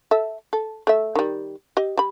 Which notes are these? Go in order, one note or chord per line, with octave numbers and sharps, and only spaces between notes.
A4 E5
A4
A3 E5
D#3 G3
G4 D#5
G3 B5